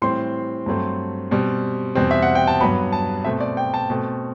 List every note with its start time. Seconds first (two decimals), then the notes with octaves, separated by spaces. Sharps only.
0.02 A2 E3 G3 C4 C6
0.66 G2 F#3 A3 C4
1.31 B2 G3 C4
1.95 E2 B2 G3 C4
2.11 E5
2.22 F#5
2.35 G5
2.47 A5
2.60 G2 F#3 B3 B5
2.93 A5
3.24 B2 A3 C4 E5
3.40 D5
3.57 G5
3.74 A5
3.90 B2 A3 C4